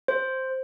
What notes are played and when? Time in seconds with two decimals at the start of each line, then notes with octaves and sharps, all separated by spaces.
0.08 C5